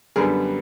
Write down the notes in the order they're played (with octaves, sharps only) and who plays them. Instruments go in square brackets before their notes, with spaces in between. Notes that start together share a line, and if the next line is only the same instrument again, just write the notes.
[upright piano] F#2 D3 G3 B3 G#4 A#4